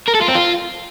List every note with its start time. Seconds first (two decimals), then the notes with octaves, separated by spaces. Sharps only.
0.08 A#4
0.14 A4
0.21 F4
0.28 C4
0.35 F4